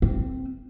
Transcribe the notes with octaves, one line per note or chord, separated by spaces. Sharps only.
C4